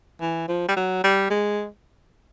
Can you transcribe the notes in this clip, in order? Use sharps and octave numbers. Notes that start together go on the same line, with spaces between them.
E3
F3
G3
F#3
G3
G#3